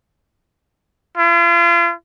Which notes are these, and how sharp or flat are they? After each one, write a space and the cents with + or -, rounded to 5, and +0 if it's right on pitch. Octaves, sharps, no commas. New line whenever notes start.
F4 -40